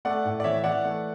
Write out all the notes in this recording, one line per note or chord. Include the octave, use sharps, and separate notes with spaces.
A3 D5 F#5
A2
D5
E3 C#5 E5
E3 D5 F#5
A3